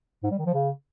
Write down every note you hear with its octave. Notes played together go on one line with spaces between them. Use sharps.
G#2
G3
D#3
F3
C#3